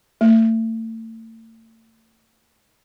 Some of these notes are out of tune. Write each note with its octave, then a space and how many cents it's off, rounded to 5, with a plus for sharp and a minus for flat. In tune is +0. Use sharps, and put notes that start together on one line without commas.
A3 +40